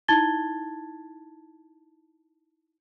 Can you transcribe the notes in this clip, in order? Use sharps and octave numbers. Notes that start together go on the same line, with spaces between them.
D#4 E4 A5 G#6 A6 G7